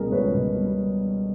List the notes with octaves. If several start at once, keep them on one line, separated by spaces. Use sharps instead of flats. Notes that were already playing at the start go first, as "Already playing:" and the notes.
Already playing: C#2 B2 G3 G#4 A#4
C#2 B4 C#5
B2
G3